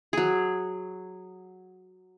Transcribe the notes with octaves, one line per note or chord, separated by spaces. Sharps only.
F#3 G#4